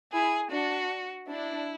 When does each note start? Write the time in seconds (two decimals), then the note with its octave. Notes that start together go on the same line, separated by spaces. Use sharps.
0.13 E4 G#4
0.51 D4 F#4
1.30 D4 E4